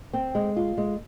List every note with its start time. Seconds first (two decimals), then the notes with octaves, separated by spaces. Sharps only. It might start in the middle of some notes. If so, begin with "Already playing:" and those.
0.13 C4
0.35 G#3
0.56 F4
0.77 G#3